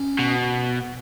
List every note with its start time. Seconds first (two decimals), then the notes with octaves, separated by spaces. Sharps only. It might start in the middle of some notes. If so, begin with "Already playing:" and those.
Already playing: C#4
0.19 B2